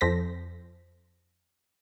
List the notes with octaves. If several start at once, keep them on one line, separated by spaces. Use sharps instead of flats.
F2 A4 C5 A#6 B6